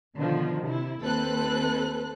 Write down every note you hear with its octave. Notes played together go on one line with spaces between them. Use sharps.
B2 D3 D#3 F3
C3 E4
D#2 C4 A4 B4 C5 F#6